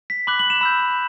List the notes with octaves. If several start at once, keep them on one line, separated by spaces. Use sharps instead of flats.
B6
B5 D6 F#6 F#7
F#7
E7
B5 E6 G6